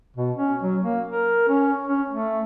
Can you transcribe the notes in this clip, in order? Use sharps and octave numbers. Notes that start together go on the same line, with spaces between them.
B2
C#4
F#3
A#3
A#4
C#4
C#4
A3